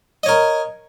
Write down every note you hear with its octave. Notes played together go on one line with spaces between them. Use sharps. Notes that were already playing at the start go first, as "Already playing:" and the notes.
A#4 C#5 D#5